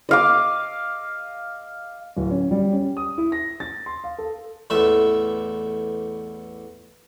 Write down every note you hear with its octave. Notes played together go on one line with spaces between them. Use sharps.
D#5 F5 D6
D1
C#4
G3
C#4
D#6
E4
A#6
A6
C6
F5
A4
A1 E2 A3 E5